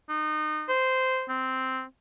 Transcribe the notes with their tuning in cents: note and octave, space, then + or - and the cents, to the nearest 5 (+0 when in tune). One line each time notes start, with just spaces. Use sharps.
D#4 -25
C5 -10
C4 -5